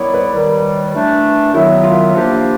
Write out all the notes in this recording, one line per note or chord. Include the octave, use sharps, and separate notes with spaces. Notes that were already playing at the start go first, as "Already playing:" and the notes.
Already playing: D#3 G3 B3 E4 C#5 D5
B4
D#2 D#3 G3 A#4
E3 A3 D4
F#2 D#3 F#3 B3 E4
F4
F3 A#3 D4 G4